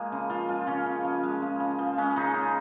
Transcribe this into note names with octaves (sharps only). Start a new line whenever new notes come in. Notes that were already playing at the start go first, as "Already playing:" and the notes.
Already playing: F3 G#3 A#3
C#3
F3 F4
G#3 F4
C#3 C#4
C#3
F3
G#3
C#3
C#3
F3
G#3 C#4
C#3 D#4
C#3